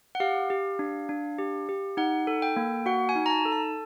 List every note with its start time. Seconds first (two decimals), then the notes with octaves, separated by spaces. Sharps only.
0.15 F#5
0.20 G4 F5
0.50 G4
0.79 D4
1.09 D4
1.38 G4
1.69 G4
1.97 D#4 F#5
2.27 A4
2.42 G5
2.56 A#3
2.86 F#4 F#5
3.09 G#5
3.16 D#4
3.26 A#5
3.30 A5
3.45 A4
3.52 A5